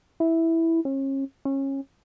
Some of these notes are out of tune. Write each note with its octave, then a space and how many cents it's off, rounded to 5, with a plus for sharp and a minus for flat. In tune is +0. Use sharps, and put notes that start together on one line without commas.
E4 -5
C#4 -35
C#4 -25